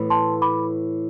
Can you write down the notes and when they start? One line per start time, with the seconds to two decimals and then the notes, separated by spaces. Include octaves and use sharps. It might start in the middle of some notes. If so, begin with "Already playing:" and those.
Already playing: A2 E3 B3
0.10 A5 C6
0.42 B5 D6